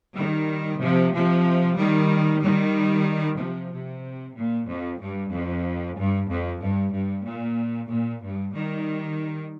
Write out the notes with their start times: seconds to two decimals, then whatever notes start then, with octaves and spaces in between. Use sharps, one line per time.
0.18 D#3 G3
0.82 C3 F3
1.14 C3 F3
1.79 D#3 G3
2.43 D#3 G3
3.39 C3 F3
3.72 C3
4.36 A#2
4.68 F2
5.01 G2
5.32 F2
5.97 G2
6.29 F2
6.61 G2
6.93 G2
7.25 A#2
7.90 A#2
8.22 G2
8.54 D#3 G3